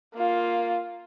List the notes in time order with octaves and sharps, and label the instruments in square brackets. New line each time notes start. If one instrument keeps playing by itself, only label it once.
[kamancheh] A#3 F4